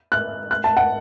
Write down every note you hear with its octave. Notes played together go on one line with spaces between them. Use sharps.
F#6
F#6
A5
F#5